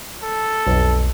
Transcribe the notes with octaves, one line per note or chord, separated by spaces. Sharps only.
A4
B1 F2